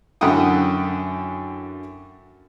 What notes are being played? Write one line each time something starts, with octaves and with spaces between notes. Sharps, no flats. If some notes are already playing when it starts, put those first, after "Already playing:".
F#2 D3 E4 F#5 G5 D#6